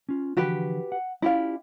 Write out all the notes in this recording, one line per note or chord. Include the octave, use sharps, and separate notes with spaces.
C#4 F4
D3 E3 F3 F#4 G4 B4
F#5
C#4 E4 F4 G4 D5 F5